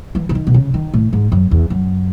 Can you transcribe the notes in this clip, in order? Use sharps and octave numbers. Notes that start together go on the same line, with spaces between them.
E3
C#3
D#3
B2
C#3
D#3
A2
G#2
F#2
E2
F#2